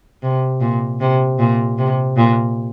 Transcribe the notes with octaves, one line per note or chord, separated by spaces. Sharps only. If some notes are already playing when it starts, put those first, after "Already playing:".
C3
A#2
C3
A#2
C3
A#2